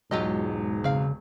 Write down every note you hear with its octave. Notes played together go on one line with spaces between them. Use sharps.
E1 G#2 F#3 F4 G4 D#5
C#3 C4 F5